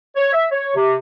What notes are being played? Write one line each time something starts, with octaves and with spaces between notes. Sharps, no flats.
C#5
E5
C#5
C3